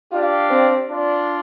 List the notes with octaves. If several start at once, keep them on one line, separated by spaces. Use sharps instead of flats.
D4 F4 G4 D5 F5
C4
D4 F4 D5